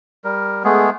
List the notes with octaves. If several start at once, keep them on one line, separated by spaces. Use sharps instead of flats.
G3 A#4
G#3 A3 B3 G#4